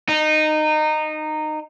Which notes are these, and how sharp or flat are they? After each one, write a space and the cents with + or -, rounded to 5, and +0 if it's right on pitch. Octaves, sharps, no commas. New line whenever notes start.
D#4 -15